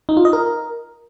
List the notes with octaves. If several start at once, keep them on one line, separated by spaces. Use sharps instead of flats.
D#4
F4
D#5
A#4